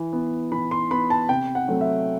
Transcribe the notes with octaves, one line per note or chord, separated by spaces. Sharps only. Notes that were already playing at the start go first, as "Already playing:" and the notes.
Already playing: E3
B3
E3 B5
C6
B3 B5
A5
C3 G5
F#5
F#3 A3 C4
E5